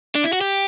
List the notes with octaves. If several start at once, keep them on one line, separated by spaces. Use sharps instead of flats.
D4
E4
F#4
G4